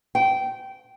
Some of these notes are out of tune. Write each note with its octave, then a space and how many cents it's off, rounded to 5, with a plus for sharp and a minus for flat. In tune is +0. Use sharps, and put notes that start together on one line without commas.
G5 -20